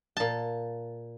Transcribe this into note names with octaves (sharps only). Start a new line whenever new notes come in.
A#2 A5